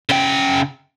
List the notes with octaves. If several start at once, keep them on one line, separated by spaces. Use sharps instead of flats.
C#3 G5